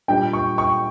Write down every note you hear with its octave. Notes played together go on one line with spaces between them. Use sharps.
A#2 G3 D4 G5
C#6
C#6